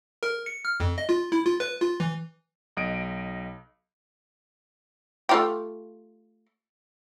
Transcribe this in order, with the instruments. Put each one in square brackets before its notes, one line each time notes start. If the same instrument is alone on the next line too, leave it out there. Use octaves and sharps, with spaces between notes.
[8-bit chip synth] A#4
C#7
F6
F2
D#5
F4
E4
F4
B4
F4
E3
[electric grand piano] B1 D#5 D7
[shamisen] A3 F4 G4